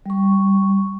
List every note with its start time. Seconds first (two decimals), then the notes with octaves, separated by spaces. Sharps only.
0.06 G3 C#6